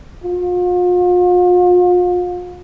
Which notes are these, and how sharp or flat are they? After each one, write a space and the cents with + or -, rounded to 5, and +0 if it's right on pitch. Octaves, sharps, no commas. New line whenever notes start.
F4 +40